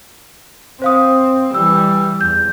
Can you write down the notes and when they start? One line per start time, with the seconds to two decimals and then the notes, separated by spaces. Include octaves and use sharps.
0.82 C4 C5 F5 D#6
1.54 E3 G3 E6
2.21 E2 G6